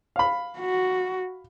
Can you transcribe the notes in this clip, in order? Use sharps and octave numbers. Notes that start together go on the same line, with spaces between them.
F5 B5
F#4